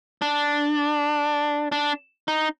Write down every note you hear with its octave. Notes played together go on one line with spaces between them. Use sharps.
D4
D4
D#4